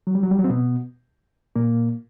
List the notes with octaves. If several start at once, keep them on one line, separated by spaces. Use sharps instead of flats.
F#3
G3
F#3
G3
F#3
C4
B2 B3
A#2 A#3